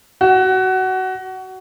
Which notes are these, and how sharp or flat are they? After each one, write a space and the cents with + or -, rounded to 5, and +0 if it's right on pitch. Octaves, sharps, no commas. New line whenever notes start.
F#4 +20